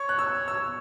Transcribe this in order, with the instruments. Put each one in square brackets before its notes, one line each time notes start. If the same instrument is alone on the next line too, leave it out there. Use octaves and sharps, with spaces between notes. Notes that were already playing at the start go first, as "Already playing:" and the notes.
Already playing: [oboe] C#5 [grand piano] C#6
[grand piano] F#6
E6
E6